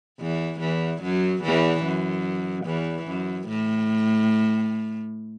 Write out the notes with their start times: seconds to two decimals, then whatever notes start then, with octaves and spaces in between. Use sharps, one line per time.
0.20 E2 E3
0.60 E2 E3
1.02 F#2 F#3
1.44 E2 E3
1.84 F#2
2.66 E2 E3
3.08 F#2
3.48 A2